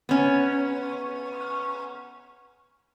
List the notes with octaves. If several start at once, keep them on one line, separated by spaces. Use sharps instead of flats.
B3 C#4